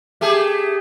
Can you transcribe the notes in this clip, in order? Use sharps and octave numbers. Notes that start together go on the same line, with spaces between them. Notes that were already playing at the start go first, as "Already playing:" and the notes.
A3 G4 G#4